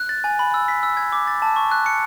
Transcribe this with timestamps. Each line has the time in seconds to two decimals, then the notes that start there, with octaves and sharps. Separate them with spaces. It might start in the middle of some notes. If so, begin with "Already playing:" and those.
Already playing: F#6
0.09 A6
0.24 G#5
0.39 B5
0.54 E6
0.68 B6
0.83 E6
0.97 G#6
1.12 D6
1.27 A6
1.42 A5
1.56 C#6
1.71 F#6
1.86 C#7